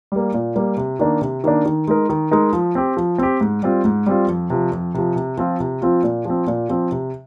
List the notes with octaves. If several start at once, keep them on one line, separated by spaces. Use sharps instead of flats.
G3 A#3
A#2
G3 A#3
C3
D#3 A#3 D4
C3
D#3 A#3 D4
D#3
G#3 D#4 A#4
D#3
G#3 D#4 A#4
F3
C4 G4
F3
C4 G4
G#2
G3 C4 F4
G#2
G3 C4 F4
F2
C3 F3
F2
C3 F3
C3
F3 C4 F4
C3
F3 C4 F4
A#2
F3 C4
A#2
F3 C4
C3